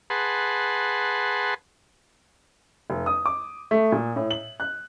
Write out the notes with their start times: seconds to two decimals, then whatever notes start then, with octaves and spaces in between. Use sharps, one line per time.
0.10 G#4 B4 F#5 A5 C6
2.90 F1
3.06 D#6
3.26 D6
3.71 A3
3.92 A#2
4.16 A2
4.30 F#7
4.60 F#6